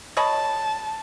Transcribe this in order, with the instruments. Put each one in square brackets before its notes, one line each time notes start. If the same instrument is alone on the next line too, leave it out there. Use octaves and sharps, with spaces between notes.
[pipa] C#5 D#5 B5 [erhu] A5